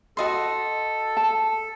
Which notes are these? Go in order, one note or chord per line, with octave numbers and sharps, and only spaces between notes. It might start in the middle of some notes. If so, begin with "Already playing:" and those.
F#4 A4 D#5 C6
A5